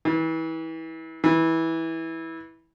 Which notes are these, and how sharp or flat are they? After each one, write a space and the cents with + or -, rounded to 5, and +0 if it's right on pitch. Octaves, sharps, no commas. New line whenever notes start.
E3 -30
E3 -15